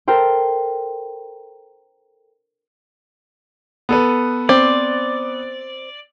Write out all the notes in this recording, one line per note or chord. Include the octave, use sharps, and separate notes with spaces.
A4 A#4 C5 G5
B3 A4 B4
C4 D5